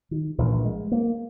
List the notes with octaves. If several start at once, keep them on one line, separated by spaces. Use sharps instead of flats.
D#3
A#1 A#2 E3
G#3
A#3